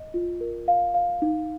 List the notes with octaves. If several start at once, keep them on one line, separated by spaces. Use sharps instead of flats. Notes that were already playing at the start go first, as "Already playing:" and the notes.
Already playing: D#5
F4
A#4
F5
F5
D#4